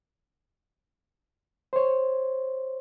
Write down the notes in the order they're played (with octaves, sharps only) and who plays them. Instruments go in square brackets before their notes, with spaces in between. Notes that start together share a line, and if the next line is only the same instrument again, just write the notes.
[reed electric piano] C5 C#5